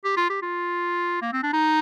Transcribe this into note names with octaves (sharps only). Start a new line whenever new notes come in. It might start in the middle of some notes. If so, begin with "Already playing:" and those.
G4
F4
G4
F4
A#3
C4
D4
D#4